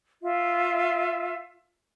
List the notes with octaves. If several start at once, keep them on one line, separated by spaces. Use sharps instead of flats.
F4 E5